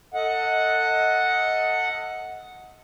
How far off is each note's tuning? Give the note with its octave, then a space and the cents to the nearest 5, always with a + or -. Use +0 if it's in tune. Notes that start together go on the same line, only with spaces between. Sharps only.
A4 +25 D#5 +20 F#5 -5